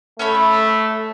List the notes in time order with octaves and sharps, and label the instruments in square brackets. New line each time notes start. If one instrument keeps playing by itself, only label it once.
[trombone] A3 [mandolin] C#4 C#5 B5